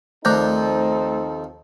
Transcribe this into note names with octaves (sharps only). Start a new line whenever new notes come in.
D#2 F3 A3 C4 D#4 A4 G6